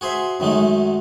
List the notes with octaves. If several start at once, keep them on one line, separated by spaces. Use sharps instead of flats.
F#4 G#4 C5 E5
F#2 D#3 F#3 G#3 A3 D#4